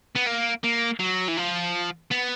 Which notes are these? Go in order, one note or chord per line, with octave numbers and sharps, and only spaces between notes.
B3
A#3
A#3
F#3
E3
F3
B3